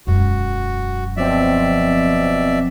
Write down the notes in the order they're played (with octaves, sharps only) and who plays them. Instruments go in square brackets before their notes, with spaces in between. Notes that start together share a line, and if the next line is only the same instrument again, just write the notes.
[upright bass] E1 F#2 [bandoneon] F#4
[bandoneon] B2 D5 E5 [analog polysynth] F3 C4